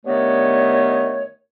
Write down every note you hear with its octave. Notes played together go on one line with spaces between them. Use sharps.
G2 D#3 A3 B3 C#5